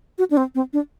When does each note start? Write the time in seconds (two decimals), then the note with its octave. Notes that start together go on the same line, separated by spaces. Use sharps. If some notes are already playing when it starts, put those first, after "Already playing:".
0.18 F#4
0.31 D4
0.37 C4
0.55 C4
0.73 D4